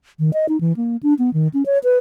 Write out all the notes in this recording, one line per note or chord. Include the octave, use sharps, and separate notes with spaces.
D#3
D#5
D#4
E3
A#3
D4
B3
D#3
C#4
C#5
B4